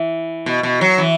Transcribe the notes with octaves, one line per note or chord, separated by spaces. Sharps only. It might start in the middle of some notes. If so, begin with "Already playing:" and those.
Already playing: E3
B2
B2
F#3
E3